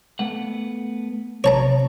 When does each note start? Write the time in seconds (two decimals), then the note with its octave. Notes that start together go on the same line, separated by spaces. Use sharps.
0.19 A3 B3 F#5
1.44 C3 C#5 A5 A#5